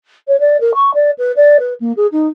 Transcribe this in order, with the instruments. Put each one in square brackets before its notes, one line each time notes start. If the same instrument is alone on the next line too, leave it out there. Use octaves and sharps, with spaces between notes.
[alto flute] C#5
D5
A#4
C#6
D5
B4
D5
B4
A#3
G#4
D#4